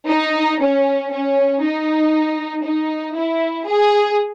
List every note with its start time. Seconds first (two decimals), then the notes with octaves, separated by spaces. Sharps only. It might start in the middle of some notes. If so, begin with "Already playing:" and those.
0.08 D#4
0.61 C#4
1.12 C#4
1.62 D#4
2.64 D#4
3.16 E4
3.67 G#4